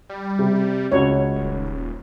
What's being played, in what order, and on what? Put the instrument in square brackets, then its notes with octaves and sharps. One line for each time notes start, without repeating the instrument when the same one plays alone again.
[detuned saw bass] G3
[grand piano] C3
[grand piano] C#2 F#4 [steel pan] C#5
[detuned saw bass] D#1